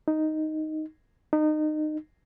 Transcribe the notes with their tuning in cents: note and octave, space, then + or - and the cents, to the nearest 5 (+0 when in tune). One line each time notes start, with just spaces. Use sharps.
D#4 +0
D#4 -25